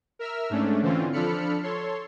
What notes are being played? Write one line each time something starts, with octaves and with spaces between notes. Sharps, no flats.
A#4 E5 E6 F6
G#2 A3 C#4 D4
D3 E3 C4 C#4 F4
F3 D4 A4 B5 F6 C#7
A4 C#5 C6